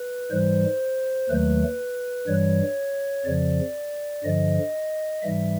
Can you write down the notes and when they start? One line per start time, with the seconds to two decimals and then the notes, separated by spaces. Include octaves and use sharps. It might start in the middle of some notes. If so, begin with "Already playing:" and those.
Already playing: B4
0.31 G#2 E3 G3 C5
1.29 D#2 D#3 F#3 A3 B4
2.27 G2 E3 G3 C#5
3.25 F2 C#3 F3 D5
4.24 G2 D3 F3 D#5
5.22 G#2 E3 G3 E5